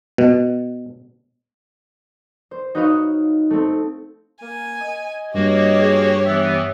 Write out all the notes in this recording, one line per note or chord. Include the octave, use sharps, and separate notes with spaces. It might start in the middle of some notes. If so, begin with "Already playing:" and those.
B2
C5
D#4 F#4 B4 C#5 D#5 F5
A3 C4
A#3 G#5
D#5
G2 A#3 F#4 G4 C#5
G#4
E3 B3 E5